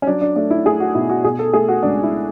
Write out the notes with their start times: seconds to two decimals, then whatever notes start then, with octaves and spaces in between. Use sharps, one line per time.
0.02 C#4
0.07 F#3 D4
0.21 D4
0.36 A3 D4
0.51 E4
0.66 A3 G#4
0.80 F#4
0.95 B2 E4
1.10 F#4
1.24 B2 G#4
1.39 A4
1.53 A3 G#4
1.68 F#4
1.83 C#2 D4
2.03 E4